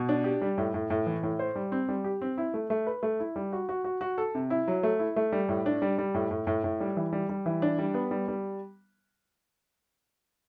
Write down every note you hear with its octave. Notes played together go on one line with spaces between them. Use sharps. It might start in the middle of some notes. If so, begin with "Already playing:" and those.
Already playing: B2
D4
G4
G3
A2
A2
A2
E3
A2
C5
G3
C4
G3
G4
C4
E4
A3
A3
B4
A3
E4
G3
F#4
F#4
F#4
F#4
A4
C3
E4
F#3
A3
E4
A3
G3
A2
D4
G3
G3
A2
A2
A2
A2
G3
E3
G3
G3
E3
D4
G3
B3
G3
G3